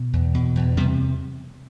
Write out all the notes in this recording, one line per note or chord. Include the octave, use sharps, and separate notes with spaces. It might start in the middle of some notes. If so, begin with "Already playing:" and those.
Already playing: B2
E2
B2
E2
C3 G3 B3